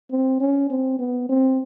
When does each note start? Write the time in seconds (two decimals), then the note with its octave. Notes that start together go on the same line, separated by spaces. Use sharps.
0.11 C4
0.40 C#4
0.70 C4
0.99 B3
1.29 C4